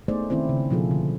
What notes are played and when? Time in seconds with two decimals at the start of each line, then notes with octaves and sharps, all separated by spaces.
0.08 A3 B3 D#4 G#4 C5 D5
0.30 D#3 C4 C#4 E4 C5
0.49 C#3
0.70 B2 F3 A#3 F4 G#4 A4
0.91 D3